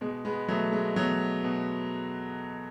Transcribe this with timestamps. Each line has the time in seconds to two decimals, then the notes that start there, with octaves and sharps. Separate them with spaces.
0.01 B2 G#3
0.25 G#3 B3
0.48 B2 F#3 A3
0.73 G#3
0.96 B2 F#3
1.44 B2